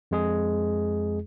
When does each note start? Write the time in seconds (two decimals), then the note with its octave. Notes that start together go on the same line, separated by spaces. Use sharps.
0.11 F2 G#3 G#4